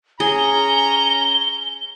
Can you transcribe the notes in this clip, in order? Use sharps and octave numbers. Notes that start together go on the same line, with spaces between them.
C#4 G#4 A#5 G7